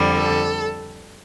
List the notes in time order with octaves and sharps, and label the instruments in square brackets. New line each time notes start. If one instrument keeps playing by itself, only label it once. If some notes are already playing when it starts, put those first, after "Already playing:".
Already playing: [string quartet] F2 D3 G3
A4